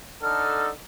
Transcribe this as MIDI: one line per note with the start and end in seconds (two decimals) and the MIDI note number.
0.22 0.69 50
0.22 0.69 63
0.22 0.69 69
0.22 0.63 89